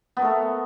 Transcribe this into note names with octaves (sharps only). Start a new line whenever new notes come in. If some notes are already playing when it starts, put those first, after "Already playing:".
A3 B3 A4 A#4